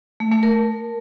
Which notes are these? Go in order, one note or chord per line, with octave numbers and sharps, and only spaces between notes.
A3
A3
A#4